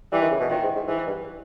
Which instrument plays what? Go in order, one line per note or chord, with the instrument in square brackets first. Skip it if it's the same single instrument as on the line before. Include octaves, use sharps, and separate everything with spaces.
[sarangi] E3 [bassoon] G3
[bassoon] D#3
C#3
B2
[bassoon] A#2 [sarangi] D#3
[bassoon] G#2
G#2
[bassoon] G#2 [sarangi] E3
[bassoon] G2